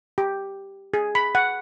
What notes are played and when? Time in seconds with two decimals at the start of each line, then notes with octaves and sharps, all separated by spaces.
0.18 G4
0.94 G#4
1.15 B5
1.35 F#5